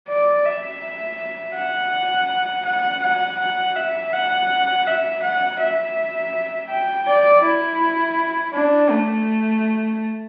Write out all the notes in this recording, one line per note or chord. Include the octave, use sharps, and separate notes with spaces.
D5
E5
F#5
F#5
F#5
F#5
E5
F#5
E5
F#5
E5
G5
D5
E4
D4
A3